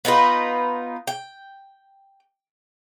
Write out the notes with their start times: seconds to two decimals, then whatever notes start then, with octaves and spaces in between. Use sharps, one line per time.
0.05 B3 D#4 F4 B4
1.07 G5